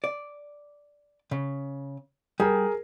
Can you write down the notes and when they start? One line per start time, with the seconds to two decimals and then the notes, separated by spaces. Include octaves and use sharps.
0.04 D5
1.31 C#3
2.40 G3 G#4 A#4